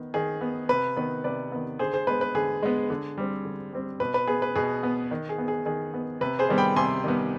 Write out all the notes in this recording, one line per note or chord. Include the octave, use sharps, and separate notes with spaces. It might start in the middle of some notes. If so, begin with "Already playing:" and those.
Already playing: D#3 B3
D#3 G#4
B3
C3 B4
D#3 B3 B4
C3 B4 D5
D#3 B3
D3 G#4 C5
G#4 C5
G#3 B3 B4
B4
D3 G#4
G#3 B3
D3
G3 C4
D3
G3 C4
B2 B4
B4
B3 G#4
B4
B2 G#4
B3
D#3
G#4
B3
G#4
D#3 G#4
B3
C3 B4
G#4 C5
D#3 G3 B3
G5 B5
C3 G#5 C6
D#3 G3 B3